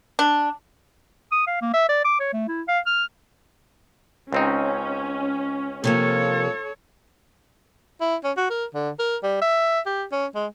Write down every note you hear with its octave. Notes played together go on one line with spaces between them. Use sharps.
D4
D#6
F5
A#3
E5
D5
D6
C#5
A3
E4
F5
F6
C#2 C4 C#4 D#4
C3 F3 A#3 A4 C#5
E4
C#4
F#4
A#4
D3
A#4
G3
E5
G4
C#4
G#3